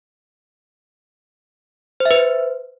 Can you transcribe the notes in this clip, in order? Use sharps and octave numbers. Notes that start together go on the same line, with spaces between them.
C5
E5
B4
C5